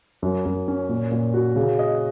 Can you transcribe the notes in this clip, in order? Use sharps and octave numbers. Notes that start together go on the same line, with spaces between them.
F#2
F#2
C#4
A#2
A#2
F#4
C#3
D#5